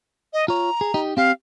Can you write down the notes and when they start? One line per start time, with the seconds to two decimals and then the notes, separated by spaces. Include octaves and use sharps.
0.33 D#5
0.48 F4 C#5 A#5
0.81 G#4
0.94 D#4 G4 D#5
1.17 C4 G4 F5